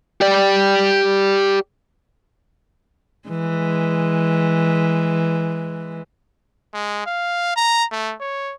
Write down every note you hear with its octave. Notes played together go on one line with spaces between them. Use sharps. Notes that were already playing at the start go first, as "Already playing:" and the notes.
G4 D5
E3 G#3
G#3
F5
A#5
A3
C#5